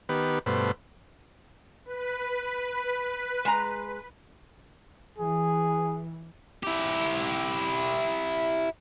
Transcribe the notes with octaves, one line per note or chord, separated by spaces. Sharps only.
D#3 B3 G4 B4
G2 B2 A3 B4 C5
B4
G#3 A#5
E3 G#4
E4 G4